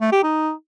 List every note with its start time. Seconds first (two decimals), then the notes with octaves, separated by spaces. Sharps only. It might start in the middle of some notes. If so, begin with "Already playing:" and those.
0.01 A3
0.12 G4
0.23 D#4